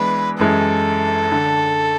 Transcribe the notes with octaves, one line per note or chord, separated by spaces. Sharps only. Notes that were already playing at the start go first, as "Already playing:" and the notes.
Already playing: E3 G#3 B3 D4 B4
F#2 E3 G#3 A4
D3